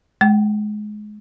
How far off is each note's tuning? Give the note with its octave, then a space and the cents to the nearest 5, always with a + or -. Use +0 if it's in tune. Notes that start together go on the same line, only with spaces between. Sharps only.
G#3 +25 G5 -20